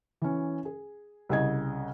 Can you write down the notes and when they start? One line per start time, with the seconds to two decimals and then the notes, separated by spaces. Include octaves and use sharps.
0.22 E3 C#4
0.65 G#4
1.29 C2 C#3 D#5 G#6